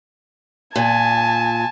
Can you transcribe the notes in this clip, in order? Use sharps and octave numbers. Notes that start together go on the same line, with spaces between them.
A#2 G#5 A5